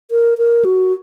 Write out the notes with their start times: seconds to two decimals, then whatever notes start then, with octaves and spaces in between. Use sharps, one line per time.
0.11 A#4
0.38 A#4
0.65 F#4